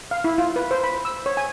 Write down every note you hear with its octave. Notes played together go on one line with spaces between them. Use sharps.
F5
E4
F4
B4
C5
B5
E6
C#5
G#5